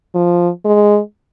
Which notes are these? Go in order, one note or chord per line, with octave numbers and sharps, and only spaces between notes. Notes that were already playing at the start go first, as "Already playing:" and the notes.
F3
G#3